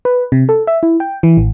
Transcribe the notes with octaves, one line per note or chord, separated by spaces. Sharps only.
B4
C3
A4
E5
E4
G5
E3
A1